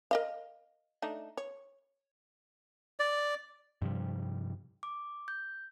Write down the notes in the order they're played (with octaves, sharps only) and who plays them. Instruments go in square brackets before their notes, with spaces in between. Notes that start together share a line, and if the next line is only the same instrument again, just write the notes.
[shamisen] A#4 D#5 F5
A3 D4 D#4
C#5
[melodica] D5
[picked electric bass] G2 C3 F3 G3
[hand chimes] D6
G6